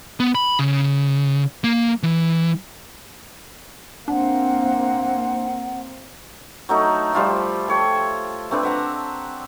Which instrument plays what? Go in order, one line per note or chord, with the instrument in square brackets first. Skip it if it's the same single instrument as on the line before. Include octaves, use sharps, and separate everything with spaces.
[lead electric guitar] B3
B5
C#3
A#3
E3
[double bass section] A#3 C4 [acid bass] D4 [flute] F#5
[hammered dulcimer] F#3 A3 D#4
F3 G3 F4 E5
A4 C#5 G5
A3 C4 D4 B4
E5 F#5 A#5